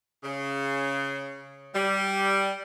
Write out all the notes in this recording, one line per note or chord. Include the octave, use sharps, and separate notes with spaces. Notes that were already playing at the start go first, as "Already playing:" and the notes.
C#3
G3